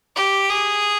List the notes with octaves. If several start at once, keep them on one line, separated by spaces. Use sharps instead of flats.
G4
G#4